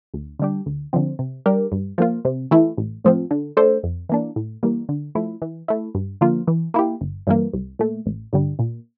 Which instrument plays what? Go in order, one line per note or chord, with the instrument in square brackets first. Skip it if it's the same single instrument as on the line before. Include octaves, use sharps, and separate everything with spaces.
[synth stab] D2
D3 G3 D4 G4
D2
D3 F3 C4
C3
G3 D4 G4 A#4
G2
F3 A#3 F4
C3
E3 A3 E4
A1
A2 F3 C4
D3
A3 D4 A4 C5
F2
E3 A#3 D4
A2
E3 G3 A#3
D3
F3 A3 E4
E3
A3 E4
G2
D3 F3 A#3 F4
E3
A#3 E4 G4
G1
G2 E3 A#3
C2
A#2 A3
A1
G2 D3 G3
A#2